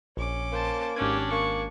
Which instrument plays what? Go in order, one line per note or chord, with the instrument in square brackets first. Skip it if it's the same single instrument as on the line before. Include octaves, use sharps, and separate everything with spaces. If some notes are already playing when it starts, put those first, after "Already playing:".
[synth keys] A#1 [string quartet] C#4 D6
[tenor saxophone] A#3 [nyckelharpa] C5 A5
[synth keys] G#1 G#6 [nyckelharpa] C#4 G4 [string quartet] D4
[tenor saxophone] A#3 [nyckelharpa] C#6